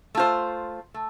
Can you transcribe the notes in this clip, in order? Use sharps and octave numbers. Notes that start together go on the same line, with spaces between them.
A3 F4 C5
A3